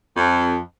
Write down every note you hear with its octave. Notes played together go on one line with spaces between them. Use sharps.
F2